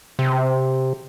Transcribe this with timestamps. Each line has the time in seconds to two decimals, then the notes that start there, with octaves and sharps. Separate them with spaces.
0.19 C3